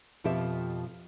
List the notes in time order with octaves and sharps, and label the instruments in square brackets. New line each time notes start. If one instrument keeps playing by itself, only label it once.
[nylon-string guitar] F2 B2 F3 G4 E5